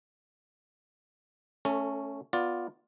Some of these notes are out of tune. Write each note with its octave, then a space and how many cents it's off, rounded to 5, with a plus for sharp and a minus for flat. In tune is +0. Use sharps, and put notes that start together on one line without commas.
A3 +0 C#4 +0 A4 +35
B3 +0 F4 +10 D5 +0